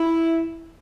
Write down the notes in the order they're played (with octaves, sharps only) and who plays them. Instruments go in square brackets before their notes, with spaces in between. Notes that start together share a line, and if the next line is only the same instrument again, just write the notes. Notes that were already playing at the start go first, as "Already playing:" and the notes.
Already playing: [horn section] E4